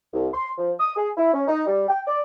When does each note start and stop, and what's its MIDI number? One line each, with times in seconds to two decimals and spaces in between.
0.14 0.28 36
0.34 0.51 84
0.58 0.72 53
0.80 0.93 87
0.97 1.09 68
1.17 1.33 64
1.34 1.44 61
1.48 1.62 63
1.66 1.86 55
1.89 2.01 79
2.07 2.20 74